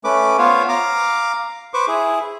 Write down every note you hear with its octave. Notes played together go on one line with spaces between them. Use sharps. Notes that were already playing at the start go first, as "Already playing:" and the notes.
A3 C#4 B4 D6
B3 F4 C5 C#5 F5
F5 A#5 D6
B4 C5 C#6 D6
E4 G#4